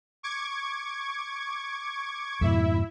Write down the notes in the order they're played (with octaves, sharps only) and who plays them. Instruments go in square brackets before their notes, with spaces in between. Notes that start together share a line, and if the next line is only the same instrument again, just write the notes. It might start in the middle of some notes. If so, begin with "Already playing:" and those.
[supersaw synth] C#6 D6 G#6
[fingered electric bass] F2 G#2 B2 [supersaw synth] E4 E5